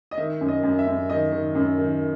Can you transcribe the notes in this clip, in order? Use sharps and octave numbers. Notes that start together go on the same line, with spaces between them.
D#5
D#3 E5
F#2
D#5
F#2
E5
F#2
D#3 D#5
D#3
F#2
D#3